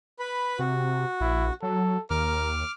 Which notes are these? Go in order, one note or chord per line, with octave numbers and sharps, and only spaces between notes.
B4 B5
C3 F#4
A#1 E4
F#3 A4
D#2 A#4 D6 F6